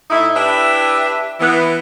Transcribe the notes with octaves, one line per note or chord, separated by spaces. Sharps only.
A2 D#4 E4
D4 E4 G4 B4 E5
E3 B3